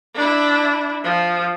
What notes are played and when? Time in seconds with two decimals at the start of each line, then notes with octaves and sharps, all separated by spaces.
0.15 D4 E4
1.03 F3